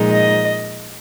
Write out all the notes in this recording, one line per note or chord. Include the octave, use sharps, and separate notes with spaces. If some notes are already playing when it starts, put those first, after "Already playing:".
Already playing: A#2 F3 G#3 D#4
D#5